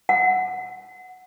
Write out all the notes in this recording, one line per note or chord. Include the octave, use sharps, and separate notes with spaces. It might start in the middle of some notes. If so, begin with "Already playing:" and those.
F#5